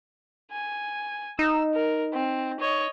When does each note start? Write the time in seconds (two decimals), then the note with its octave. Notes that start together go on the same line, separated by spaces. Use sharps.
0.51 G#5
1.39 D#4 E6
1.74 A#4
2.13 C4
2.60 C#5 D#5